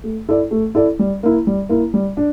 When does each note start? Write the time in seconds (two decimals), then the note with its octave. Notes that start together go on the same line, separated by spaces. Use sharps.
0.04 A3
0.29 E4 A4 D5
0.51 A3
0.75 E4 A4 D5
0.99 G3
1.23 A#3 E4
1.47 G3
1.69 A#3 E4
1.94 G3
2.17 D4